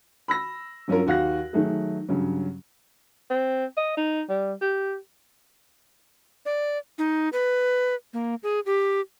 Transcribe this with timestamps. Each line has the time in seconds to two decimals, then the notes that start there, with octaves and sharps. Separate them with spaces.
0.28 B5 E6 A#6
0.88 G2 F#3 C#4 F4 A#4
1.07 D#2 F#4 F5 F#6 A#6
1.53 D#3 F#3 A3 G#4
2.09 G2 C#3 F#3
3.30 C4
3.77 D#5
3.97 D#4
4.29 G3
4.61 G4
6.46 D5
6.98 D#4
7.33 B4
8.13 A#3
8.43 G#4
8.66 G4